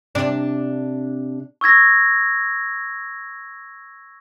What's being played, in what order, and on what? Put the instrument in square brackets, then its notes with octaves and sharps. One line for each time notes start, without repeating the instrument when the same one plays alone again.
[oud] C3 D4 D5
[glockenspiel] C#6 E6 G#6 A#6